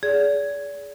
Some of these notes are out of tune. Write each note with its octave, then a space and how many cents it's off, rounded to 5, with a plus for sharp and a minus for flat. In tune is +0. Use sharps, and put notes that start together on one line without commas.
G#4 +10 D5 -40